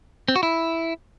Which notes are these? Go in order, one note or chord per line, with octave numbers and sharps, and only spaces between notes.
C4
F#4
E4